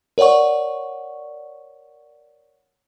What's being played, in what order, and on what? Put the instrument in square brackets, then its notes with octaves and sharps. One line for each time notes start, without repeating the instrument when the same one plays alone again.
[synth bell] A#4 C#5 D5 F#5 C#6